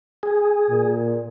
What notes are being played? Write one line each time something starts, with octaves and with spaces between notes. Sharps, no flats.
G#4
A#2